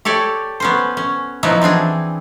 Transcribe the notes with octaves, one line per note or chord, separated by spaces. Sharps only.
G4 A4 C#5 D5
B3 C#4 C5
C#4
F3 F#3 B3 D#4 E4
E3 C4 D4 G#4